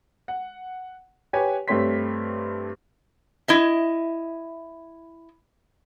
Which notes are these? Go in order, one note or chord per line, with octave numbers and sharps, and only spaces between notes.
F#5
G4 B4 C#5 G#5
G2 A3 C4 C#5 C6 B6
E4 D#5 E5